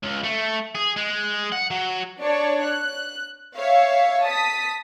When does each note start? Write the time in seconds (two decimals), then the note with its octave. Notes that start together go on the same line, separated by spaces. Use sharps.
0.03 C#2
0.24 A3
0.75 G#4
0.96 G#3
1.52 F#5
1.71 F#3
2.22 D4 C#5 D5
2.64 F#6
3.55 C#5 E5 F5
4.24 A5 D#6 B6